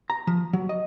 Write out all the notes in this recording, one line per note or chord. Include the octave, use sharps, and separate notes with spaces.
A#5
F3
F#3
D#5